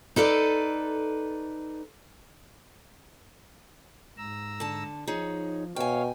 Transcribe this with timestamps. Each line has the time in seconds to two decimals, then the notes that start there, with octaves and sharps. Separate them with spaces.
0.16 D#4 A4 B4 D5
4.17 G#2 A#5 E6
4.60 D3 A5
5.07 F3 D#4 G#4 C#5
5.76 B2 C#5 F5 G5 G#5